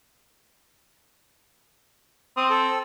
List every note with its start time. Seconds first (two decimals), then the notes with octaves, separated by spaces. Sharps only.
2.37 C4 D#6
2.50 A4